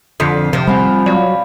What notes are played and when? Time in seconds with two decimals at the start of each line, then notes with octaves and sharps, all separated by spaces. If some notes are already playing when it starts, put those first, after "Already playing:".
0.20 F2 D3 D#6 B6 C7
0.53 C3 F3
0.68 G3 C4 F#5 G#5 B5
1.06 F#3 D5 F5 B5